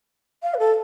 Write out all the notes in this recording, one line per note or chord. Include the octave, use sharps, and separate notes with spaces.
F5
B4
A4